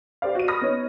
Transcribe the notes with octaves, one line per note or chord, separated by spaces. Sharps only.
G4 C5 D5 F5
F#4 D#7
B5 D#6 F6 A#6
B3 D#4 C#5